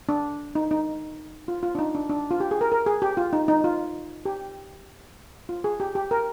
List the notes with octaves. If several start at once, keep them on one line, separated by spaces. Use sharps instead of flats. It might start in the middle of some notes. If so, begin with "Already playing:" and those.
D4
D#4
D#4
F4
F4
D4
D#4
D4
D4
F4
G4
G#4
A#4
A#4
G#4
G4
F4
D#4
D#4
F4
G4
F4
G#4
G4
G4
A#4